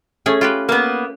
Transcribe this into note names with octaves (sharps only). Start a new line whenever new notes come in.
A3 C#4 G#4
F4 G4 B4
A#3 B3